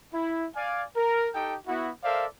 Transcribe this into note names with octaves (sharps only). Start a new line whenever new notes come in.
E4
D5 F5 G#5
A#4
D#4 G4 A4 G5
B3 E4 F#4
A4 A#4 C5 D5 E5 F5